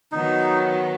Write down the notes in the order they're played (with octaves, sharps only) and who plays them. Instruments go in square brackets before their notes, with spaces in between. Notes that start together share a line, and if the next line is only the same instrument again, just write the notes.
[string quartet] D#3 F#3 B3 [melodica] D#4